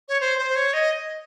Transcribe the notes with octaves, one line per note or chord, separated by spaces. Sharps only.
C#5
C5
C5
C#5
D#5